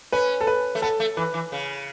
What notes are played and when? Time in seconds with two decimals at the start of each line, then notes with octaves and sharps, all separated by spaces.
0.12 C#4 B4
0.41 A4
0.47 B4
0.75 A3
0.82 B3 A4
1.00 A3
1.17 E3 B4
1.34 E3
1.52 C#3